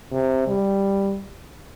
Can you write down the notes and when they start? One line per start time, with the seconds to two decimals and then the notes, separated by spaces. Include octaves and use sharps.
0.11 C3
0.48 G3